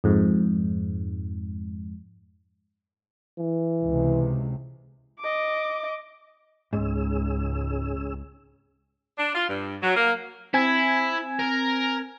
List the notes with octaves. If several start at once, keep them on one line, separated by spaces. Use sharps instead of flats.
F2 G#2
E3
C#2 C3
D#5 D6
C#2 G#2 C#4 G#4 E6
D4
F4
G2
F#3
A#3
C4 E4 G#5 G#6
A#4